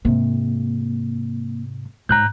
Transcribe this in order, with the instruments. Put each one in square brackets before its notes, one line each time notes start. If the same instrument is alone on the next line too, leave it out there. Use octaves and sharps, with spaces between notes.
[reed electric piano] G#2 C3 [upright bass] A#3
[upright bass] G#2 [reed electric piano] A#5 F#6 G6